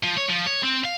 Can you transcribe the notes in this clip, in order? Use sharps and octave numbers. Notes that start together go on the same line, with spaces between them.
F3
C#5
F3
C#5
C4
F5